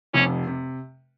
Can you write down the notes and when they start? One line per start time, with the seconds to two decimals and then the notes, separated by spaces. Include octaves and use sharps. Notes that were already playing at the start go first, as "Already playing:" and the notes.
0.14 F1 F2 C3 C#4
0.47 C3